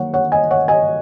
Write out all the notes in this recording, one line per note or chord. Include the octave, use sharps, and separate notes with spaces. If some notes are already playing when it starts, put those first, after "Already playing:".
Already playing: D#3 F#3 A#3 C#5 F#5
C#5 F#5
D#5 G#5
C#5 F#5
D#5 G#5